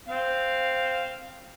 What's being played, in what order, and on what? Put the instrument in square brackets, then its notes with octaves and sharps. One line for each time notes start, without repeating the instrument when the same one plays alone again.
[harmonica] C4 F5